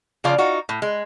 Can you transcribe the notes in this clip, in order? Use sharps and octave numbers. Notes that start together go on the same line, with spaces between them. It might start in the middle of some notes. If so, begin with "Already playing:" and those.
C#3 F3 C#4 F4 D5
D#4 F4 F#4
A2
G#3